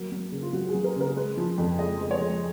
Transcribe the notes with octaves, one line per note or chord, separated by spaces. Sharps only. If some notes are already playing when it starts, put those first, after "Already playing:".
Already playing: F#3 A#3
F#3
C#3
F4
F#3 F#4
F#4
G#4
F#3
A#4
C#3 A#4
G#3 B4
F3
F2
G#3 D#5
G#3
C#5
G#3